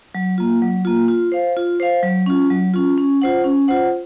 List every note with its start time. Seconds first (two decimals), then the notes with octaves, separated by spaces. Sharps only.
0.15 F#3
0.38 A#3 F4
0.62 F#3
0.85 A#3 F4
1.08 F4
1.32 C5 F5
1.57 F4
1.80 C5 F5
2.03 F#3
2.26 C#4 F4
2.50 F#3
2.74 C#4 F4
2.98 C#4
3.22 F4 C5 F#5
3.44 C#4
3.68 F4 C5 F#5